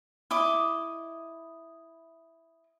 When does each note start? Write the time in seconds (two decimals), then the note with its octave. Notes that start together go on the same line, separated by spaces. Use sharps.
0.31 E4 D#5 D6